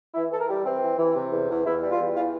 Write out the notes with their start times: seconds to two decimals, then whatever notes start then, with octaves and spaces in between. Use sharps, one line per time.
0.14 E3 E4
0.31 E3 A4
0.39 A#4
0.48 G3
0.65 E3 C4
0.82 E3
0.98 E3
1.15 C3
1.32 E2
1.49 E2
1.65 E2 E4
1.82 G3
1.91 F4
1.99 E2
2.15 E3 F4